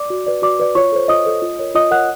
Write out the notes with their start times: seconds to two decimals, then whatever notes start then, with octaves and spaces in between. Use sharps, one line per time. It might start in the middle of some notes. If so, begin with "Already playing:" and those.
Already playing: D5 D6
0.10 F#4
0.27 B4 D5
0.42 F#4 D5 D6
0.59 B4 D5
0.75 F4 C#5 C#6
0.92 A4 C5
1.08 F4 D#5 D#6
1.25 A4 C5
1.42 F4
1.59 A#4 C#5
1.75 F4 D#5 D#6
1.91 A#4 C#5 F#5 F#6